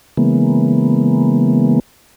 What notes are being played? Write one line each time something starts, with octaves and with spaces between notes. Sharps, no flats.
C#3 E3 G#3 A#3 B3